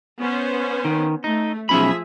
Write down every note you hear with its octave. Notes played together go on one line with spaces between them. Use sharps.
B3 C#4 C5
D#3
A3 D#4
B1 F3 C#4 G#4 E5 B5